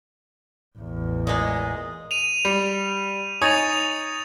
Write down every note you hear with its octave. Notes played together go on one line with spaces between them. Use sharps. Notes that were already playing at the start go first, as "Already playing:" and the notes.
A1 E2
A#2 G#3 D#5
D#7 F7
G3
D#4 C#5 G#5 D#6 A6 F7